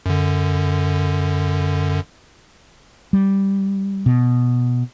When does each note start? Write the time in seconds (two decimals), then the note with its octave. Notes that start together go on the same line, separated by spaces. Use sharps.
0.06 F#2 D3
3.13 G3
4.06 B2